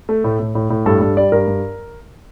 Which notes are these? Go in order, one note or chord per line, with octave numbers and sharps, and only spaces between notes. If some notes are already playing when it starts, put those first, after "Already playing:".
A3
A2
A2
A2
A2
G2 A4
G2 A4
G3 D5
G2 A#4
G2